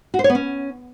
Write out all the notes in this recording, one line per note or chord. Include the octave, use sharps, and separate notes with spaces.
F#4
C5
C#5
B3
C#4